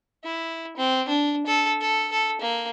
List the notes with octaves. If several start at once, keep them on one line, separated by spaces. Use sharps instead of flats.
E4
C4
D4
A4
A4
A4
A#3